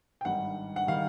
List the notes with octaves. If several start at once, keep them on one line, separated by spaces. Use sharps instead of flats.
G5
G#1 G2 D#3 G3 F#5
F#5
D#3 G3 F5